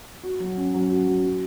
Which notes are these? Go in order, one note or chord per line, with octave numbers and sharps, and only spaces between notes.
F#4
F#3
C#4
F#3
F#4
F#3
F#4